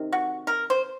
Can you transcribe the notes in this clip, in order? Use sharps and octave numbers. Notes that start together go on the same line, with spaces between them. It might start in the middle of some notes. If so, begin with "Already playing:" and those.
Already playing: C3 D#3
F#4
A#4
C5